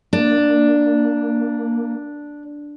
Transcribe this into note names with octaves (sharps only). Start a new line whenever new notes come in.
A#3 D4